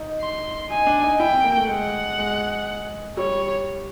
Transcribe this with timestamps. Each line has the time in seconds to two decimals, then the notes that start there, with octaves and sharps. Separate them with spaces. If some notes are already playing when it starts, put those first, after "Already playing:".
Already playing: D#4
0.21 C6
0.70 D#4 G#5
0.87 D4
1.04 D#4
1.20 E4 G5
1.32 C4
1.44 A#3
1.56 A3
1.69 G#3 F#5
2.19 G#3
3.17 G3 C#5